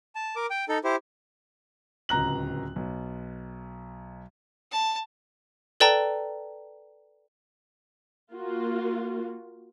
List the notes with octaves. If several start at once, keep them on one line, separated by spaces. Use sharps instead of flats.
A5
A#4 D6
G5
D#4 A4
E4 G4 C5
D1 C#2 A#5 F#6 F#7
B1
A5
A4 B4 D5 G5 A5 A#5
A#3 F4 F#4